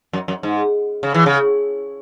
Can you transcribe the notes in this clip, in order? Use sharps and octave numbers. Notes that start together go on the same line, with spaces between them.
F#2
F#2
G#2
C#3
E3
C#3